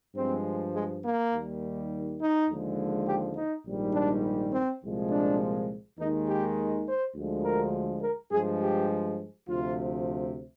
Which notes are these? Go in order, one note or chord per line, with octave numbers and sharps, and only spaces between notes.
G2 F3 G#3 C4
G#3
A#3
D#2 D#3 G3
D#4
D#2 D3 F3 G#3
G4
D#4
A#1 G#2 D#3 G3
D4
C4
C2 A#2 F3 G#3
D4
D#2 D#3 G#3 D#4
G4
C5
D2 D3 F3 G#3
A#4
A#4
G2 F3 G#3 G#4
G4
D2 C3 F3 F4